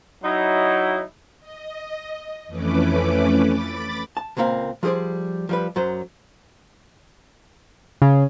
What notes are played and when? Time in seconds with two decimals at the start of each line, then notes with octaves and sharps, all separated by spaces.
0.23 F#3 D#4 E4
1.40 D#5
2.47 F2 E3 A3 C#4 B4 D6
3.48 B5 D6 A6
4.17 A5
4.37 C#2 A#2 A#3 C4 F5
4.83 F3 G3 G#4 C5 D5
5.49 F3 G3 B4
5.76 F#2 F#3 C5
8.02 C#3